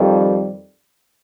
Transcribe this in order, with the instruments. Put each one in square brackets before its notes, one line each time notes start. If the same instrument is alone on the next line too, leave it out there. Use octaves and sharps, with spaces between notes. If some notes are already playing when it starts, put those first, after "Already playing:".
Already playing: [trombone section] F2 D#3 G3